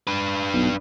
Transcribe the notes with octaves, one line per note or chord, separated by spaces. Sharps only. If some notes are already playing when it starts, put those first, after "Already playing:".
D4 B4
B1